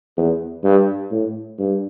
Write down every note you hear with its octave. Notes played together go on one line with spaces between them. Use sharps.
E2
G2
A2
G2